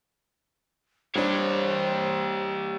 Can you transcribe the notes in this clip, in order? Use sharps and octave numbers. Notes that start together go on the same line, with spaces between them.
G3 D4 G4 C5 C#5